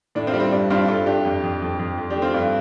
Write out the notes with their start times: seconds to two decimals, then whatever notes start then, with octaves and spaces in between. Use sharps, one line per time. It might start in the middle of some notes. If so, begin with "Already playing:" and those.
0.15 A2 D4
0.27 C4 F4
0.34 G3
0.40 C4
0.52 G2 D4
0.70 G2 C4 F4
0.88 G2 F4 A4
1.06 G2 D4 G4
1.25 F2
1.44 F2
1.62 F2
1.79 F2
1.98 F2
2.10 D4 G4
2.16 A3
2.22 C4 F4
2.34 G2